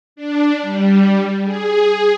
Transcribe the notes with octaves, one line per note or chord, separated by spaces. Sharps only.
D4
G3
G#4